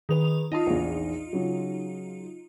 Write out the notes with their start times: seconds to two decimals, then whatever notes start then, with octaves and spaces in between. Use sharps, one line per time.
0.09 D#3 G#4 B4 F7
0.52 D#4 F4 D#5 A5 D#6
0.66 A#1 E2
1.33 C#3 F#3